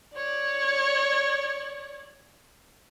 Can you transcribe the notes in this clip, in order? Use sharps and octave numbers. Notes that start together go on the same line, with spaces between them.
C#5 D5